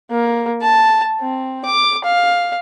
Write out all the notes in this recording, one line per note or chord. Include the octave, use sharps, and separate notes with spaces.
A#3
A5
C4
D6
F5